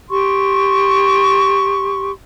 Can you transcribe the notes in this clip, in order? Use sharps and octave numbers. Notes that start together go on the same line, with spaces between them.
G4 C6 C#6